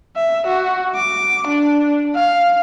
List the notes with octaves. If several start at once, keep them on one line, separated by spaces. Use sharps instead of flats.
E5
F#4
D6
D4
F5